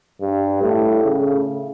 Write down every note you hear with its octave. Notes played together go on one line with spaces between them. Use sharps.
G2
A2
C#3